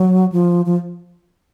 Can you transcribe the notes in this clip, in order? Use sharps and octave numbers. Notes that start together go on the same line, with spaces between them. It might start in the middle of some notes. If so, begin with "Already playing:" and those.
Already playing: F#3
F3
F3